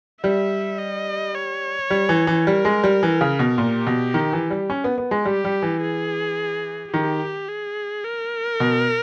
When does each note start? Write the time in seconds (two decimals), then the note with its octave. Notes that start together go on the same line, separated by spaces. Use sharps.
0.23 G3 E5
0.79 D#5
1.35 C#5
1.90 G3
2.09 E3
2.27 E3
2.47 G3 A#4
2.65 G#3
2.84 G3
3.03 E3
3.21 C#3
3.39 B2
3.57 A#2 G4
3.87 B2
4.14 D#3
4.33 E3
4.51 G3
4.70 C#4
4.84 B3
4.98 B3
5.11 G#3
5.25 G3 G4
5.45 G3
5.62 E3
5.82 G#4
6.93 D#3 G4
7.49 G#4
8.05 A#4
8.60 B2